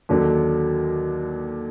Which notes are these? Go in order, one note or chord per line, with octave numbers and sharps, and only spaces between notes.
D#2 D3 F#3